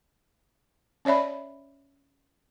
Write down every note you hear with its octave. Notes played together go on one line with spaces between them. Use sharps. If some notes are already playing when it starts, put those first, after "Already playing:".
C#4 C#5 D5 E5 B5